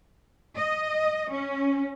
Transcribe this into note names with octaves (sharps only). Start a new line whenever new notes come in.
D#5
C#4